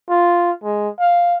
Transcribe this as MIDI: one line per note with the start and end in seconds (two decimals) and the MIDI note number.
0.10 0.52 65
0.64 0.89 56
1.00 1.37 77